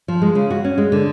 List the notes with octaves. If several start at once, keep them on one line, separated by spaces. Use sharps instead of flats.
F3
G#3
C#3
F#4
C#4
G#3
D3